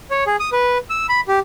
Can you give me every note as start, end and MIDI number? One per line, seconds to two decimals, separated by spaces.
0.10 0.24 73
0.26 0.36 68
0.40 0.50 87
0.52 0.78 71
0.90 1.07 88
1.09 1.20 83
1.28 1.39 67